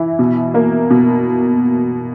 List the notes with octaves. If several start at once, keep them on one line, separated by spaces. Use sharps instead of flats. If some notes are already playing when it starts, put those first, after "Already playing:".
Already playing: E3 E4
B2
A#3
B2